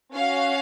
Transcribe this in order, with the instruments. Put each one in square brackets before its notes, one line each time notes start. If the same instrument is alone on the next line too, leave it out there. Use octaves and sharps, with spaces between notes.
[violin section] C#4 F#4 F5